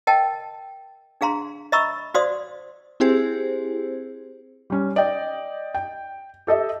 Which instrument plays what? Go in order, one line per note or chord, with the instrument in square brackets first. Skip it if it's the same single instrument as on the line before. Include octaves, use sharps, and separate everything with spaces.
[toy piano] A#4 D#5 G5 A5
D4 G#4 F5 A#5 C6
D#5 E5 A#5 B5 C#6 E6
F#4 C5 D5 F5 C6 D#6
[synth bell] C4 E4 G4 G#4 C5
[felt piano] G3 C#4
D5 D#5 G5
G5
G4 A4 D#5 E5